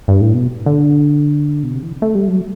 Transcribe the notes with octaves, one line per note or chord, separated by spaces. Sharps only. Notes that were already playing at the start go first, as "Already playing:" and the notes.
G2
A2
B2
D3
B2
C3
E3
A3
G3
F#3